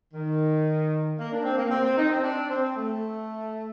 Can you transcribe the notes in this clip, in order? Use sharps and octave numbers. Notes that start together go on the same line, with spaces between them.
D#3
A#3
D4
C4
A#3
C4
C4
D#4
C4
D4
C4
A3